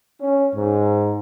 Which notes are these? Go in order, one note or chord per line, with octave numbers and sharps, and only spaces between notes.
C#4
G#2